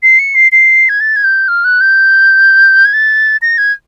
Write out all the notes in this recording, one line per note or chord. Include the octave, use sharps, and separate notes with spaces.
C7
C#7
C7
C7
G#6
A6
G#6
G6
F6
F#6
G6
G#6
A6
A#6
G#6